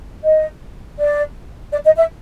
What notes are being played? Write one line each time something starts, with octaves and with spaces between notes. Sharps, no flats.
D#5
D5
D5
D#5
E5